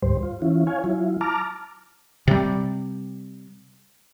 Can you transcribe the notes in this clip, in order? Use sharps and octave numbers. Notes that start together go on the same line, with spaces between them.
D2 G#2 G3 C5
F4
E3 C#4 E4 F4
C#5 F5 G#5
F#3 E4 F4
A5 A#5 D6 F6
C3 G3